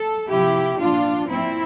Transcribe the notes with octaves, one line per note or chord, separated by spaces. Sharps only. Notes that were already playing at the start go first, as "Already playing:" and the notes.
Already playing: A4
C3 F3 E4 G4
A#2 F3 D4 F4
A#2 F3 C4 E4